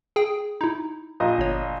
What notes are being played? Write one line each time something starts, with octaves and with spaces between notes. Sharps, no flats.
G#4 G5
D#4 E4
A#1 D#5
G1 C#5